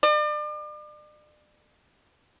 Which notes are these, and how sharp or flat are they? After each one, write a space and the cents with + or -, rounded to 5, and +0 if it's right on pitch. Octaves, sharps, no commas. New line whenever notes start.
D5 +40